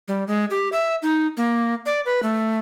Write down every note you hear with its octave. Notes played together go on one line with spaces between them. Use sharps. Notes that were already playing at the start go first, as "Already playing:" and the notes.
G3
G#3
G4
E5
D#4
A#3
D5
B4
A3